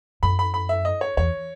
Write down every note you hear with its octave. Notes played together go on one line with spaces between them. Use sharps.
F#2 B5
B5
B5
E5
D#5
C#5
E2 C#5